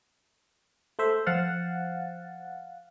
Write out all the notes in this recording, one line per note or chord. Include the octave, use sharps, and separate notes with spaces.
A3 C5 E5
F3 C5 F5 F#5 A6